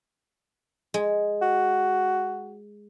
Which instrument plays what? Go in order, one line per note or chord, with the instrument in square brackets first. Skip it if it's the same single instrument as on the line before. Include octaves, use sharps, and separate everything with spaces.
[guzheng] G#3
[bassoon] F#4